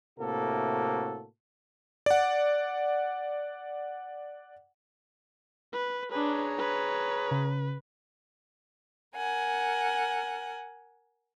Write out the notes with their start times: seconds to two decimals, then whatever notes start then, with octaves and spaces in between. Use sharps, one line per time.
0.19 A2 C3 A#3 F#4 A4
2.06 D5 F#5
5.73 B4
6.11 D4 G#4 B4 C#5 A#5
6.58 B4
7.31 C#3
9.15 A#4 F#5 G#5